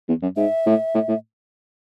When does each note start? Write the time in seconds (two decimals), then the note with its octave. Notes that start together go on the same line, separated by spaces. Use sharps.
0.08 E2
0.22 F#2
0.37 G#2 E5
0.66 A2
0.94 A2
1.09 A2